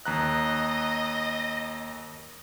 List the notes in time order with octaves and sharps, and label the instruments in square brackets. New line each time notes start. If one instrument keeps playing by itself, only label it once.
[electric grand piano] D#2 A#5 F#6 [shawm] D#5